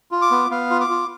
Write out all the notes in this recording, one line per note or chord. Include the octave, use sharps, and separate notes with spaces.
F4
D6
B3
B3 F5
F4
D6
F4